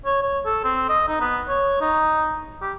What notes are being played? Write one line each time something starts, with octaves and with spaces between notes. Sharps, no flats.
C#5
C#5
A4
C4
D#5
D#4
B3
C#5
D#4
G4